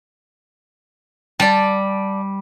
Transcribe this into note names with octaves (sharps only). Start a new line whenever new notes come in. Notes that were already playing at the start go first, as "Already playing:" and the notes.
G3 D5 A5